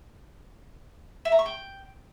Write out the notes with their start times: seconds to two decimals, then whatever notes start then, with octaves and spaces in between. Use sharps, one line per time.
1.25 E5
1.32 A#5
1.39 C#6
1.46 G5